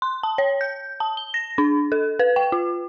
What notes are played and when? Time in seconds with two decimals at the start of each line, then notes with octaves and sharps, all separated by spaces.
0.02 C6
0.23 A5
0.38 C#5
0.61 G6
1.00 A5
1.17 G7
1.34 A#6
1.58 D4
1.92 A4
2.19 B4
2.36 G5
2.52 F4